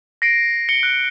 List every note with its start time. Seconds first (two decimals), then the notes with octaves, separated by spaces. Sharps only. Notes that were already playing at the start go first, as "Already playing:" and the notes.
0.22 A#6 C7 D7
0.69 C#7 G7
0.83 F#6